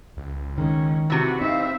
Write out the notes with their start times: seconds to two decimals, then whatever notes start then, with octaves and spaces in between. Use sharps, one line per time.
0.17 C#2
0.58 D#3 G#3 C#4
1.10 C3 E3 F#4
1.42 C4 D#4 E5 F5